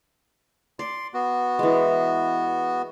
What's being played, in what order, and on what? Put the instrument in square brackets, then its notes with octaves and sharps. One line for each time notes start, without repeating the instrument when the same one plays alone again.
[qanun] D5 [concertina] C6
[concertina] B3 F#4
[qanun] E3 G#3